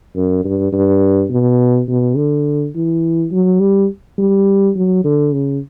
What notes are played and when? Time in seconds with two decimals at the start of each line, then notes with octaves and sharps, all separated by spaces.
0.15 F#2
0.45 G2
0.73 G2
1.30 B2
1.88 B2
2.16 D3
2.75 E3
3.32 F#3
3.60 G3
4.18 G3
4.76 F#3
5.05 D3
5.33 C#3